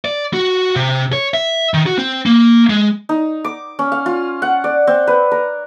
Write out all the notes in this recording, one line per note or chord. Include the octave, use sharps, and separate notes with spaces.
D5
F#4
C3
C#5
E5
D#3
F#4
C4
A#3
G#3
D#4
D6
C#4
F5
F4
F#5
D5
C4
B4
A#4